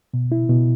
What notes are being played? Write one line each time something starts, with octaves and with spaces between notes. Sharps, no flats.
B2
E4
B2